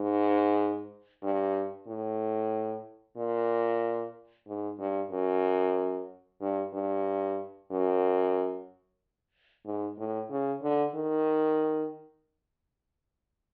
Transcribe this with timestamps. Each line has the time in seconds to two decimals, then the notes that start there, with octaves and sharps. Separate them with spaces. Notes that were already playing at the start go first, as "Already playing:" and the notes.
Already playing: G#2
1.23 G2
1.87 A2
3.17 A#2
4.48 G#2
4.79 G2
5.11 F#2
6.41 G2
6.74 G2
7.71 F#2
9.66 G#2
9.98 A2
10.30 C#3
10.63 D3
10.95 D#3